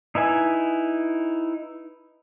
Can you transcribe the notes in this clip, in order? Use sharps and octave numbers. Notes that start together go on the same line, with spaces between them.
D#4 E4 B4 G#5